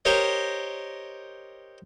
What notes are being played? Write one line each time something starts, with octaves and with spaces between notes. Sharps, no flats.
G4 A#4 C5 C#5 D#5